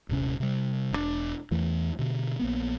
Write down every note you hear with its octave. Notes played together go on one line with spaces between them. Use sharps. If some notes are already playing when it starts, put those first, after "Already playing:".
D#1 G#1 C3 C#4
C3 G3
E1 C3 D4
E2 E3 A3
B2 D3
A#1 A#3 B3